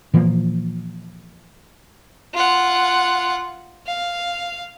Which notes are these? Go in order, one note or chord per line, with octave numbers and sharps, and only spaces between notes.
A#2 E3 F3 A#3
F4 F#5
F5